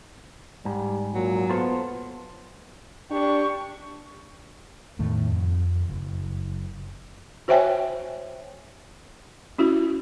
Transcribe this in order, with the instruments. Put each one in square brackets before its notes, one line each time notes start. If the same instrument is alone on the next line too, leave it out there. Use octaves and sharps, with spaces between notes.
[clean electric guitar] G#2 [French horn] G3
[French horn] A#2 [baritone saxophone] F#3
[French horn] B3 [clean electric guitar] F4 A4 C5
[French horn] D4 [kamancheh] G4 C#6
[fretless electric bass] E2 A2 D#3 A3
F2
F#1
[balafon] F#4 C5 C#5 E5 G5 G#5
C#4 E4 F#4